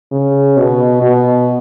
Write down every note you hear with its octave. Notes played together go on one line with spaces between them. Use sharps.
C#3
B2
B2